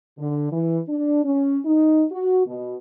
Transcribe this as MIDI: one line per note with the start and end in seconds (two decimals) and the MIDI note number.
0.18 0.50 50
0.51 0.78 52
0.88 1.23 62
1.24 1.58 61
1.64 2.03 63
2.11 2.45 66
2.46 2.74 47